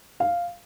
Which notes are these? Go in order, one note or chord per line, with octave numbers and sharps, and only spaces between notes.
F5